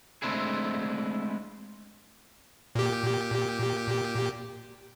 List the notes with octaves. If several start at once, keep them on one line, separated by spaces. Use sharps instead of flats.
G#3 A3 C4 D4 E4 G#4
A#2 G4